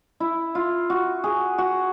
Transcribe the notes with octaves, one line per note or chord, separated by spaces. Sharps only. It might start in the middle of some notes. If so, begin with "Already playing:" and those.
E4
F4
F#4
G#4
F#4